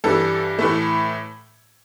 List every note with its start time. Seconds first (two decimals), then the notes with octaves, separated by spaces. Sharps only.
0.04 G2 E3 G3 A4
0.58 A2 E3 A3